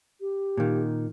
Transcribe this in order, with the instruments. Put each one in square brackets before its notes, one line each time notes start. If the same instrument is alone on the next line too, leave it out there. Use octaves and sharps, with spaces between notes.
[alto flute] G4
[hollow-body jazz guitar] A#2 D#3